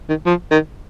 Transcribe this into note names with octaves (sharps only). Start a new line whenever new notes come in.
D#3
F3
D#3